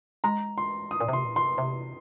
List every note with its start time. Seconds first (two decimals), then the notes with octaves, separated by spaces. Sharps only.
0.24 G#3 A#5
0.58 C6
0.91 D#6
1.01 A#2
1.09 C3 C6
1.25 A#2
1.36 C6
1.42 C3
1.58 C3